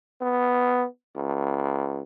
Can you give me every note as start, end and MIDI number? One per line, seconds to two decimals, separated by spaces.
0.22 0.86 59
1.16 2.03 37